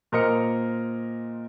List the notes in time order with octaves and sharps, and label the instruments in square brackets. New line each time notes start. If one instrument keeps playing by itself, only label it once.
[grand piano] A#2 A#4 C5 D#5 F6 C#7